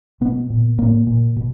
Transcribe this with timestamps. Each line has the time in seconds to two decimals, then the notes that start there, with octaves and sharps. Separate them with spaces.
0.21 B2 B3
0.50 A#2
0.78 A2 A#3
1.07 A#2
1.36 B2